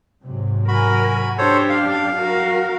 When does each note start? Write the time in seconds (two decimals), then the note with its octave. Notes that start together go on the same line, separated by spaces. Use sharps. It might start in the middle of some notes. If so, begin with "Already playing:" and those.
0.23 G#2 C3 F#3
0.68 F#4 A#4 G#5 B5
1.38 F#2 D4 G4 A4 C5 C#5
1.70 F5
2.17 F#4 A#4